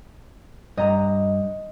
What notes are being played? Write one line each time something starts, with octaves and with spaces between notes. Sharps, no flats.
G2 D#5 A#5